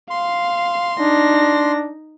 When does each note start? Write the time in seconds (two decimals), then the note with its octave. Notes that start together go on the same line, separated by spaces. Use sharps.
0.10 F5 C6
1.00 D4 D#4 A#6